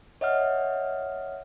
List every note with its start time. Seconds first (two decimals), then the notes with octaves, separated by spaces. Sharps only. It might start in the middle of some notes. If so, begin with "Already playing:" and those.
0.21 C#5 D#5 E5 F#5 F6